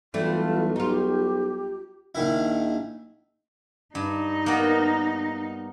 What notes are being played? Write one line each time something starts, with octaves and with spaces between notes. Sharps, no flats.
B1 E3 G3 A3 F4
D#4 F4 G4
A#1 D#3 E4
G2 D#4
A#3 B3